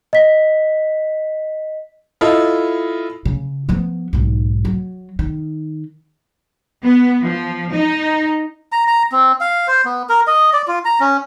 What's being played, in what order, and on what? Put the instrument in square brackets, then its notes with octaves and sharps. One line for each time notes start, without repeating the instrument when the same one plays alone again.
[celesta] D#5 B6
[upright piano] E4 F4 A4 D#5
[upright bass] C#3
F3 B3
B1 G#2
F#3
D#3
[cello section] B3
F3
D#4
[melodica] A#5
A#5
C4
F5
C5
B3
A#4
D#5
D5
F4
A#5
C#4